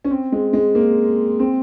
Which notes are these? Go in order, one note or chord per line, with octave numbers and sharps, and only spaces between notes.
C#4
C4
G#3
G#3
A#3
C4